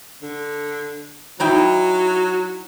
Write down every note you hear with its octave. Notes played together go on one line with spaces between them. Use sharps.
D3
F#3 D#4 E4 G5